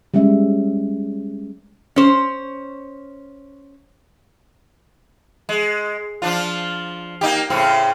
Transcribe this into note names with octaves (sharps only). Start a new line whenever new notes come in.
G3 G#3 C#4 E5
C#4 C5
G#3
F3 D4 F4
A#3 D#4 G4
A2 C#3 C4